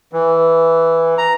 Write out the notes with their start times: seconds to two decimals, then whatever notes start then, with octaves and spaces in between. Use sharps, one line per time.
0.13 E3
1.18 A#5